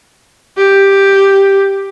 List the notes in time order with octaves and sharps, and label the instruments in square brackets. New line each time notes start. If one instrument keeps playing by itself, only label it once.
[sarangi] G4